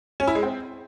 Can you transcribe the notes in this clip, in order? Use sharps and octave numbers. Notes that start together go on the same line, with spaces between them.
C#4
E4
G#3
C4